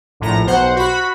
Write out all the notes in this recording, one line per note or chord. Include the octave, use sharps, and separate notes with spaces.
A#1 A2 A#5
B1 C5 F#5
F#4 B5